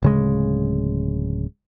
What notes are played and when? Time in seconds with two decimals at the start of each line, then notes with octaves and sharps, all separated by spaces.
0.02 D1 C#3 G#3